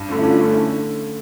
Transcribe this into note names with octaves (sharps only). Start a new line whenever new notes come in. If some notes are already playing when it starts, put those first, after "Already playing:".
Already playing: G2
D3 A3 C#4
E4
G2 D4 F4
D3 A3 C#4
D3 C#4 E4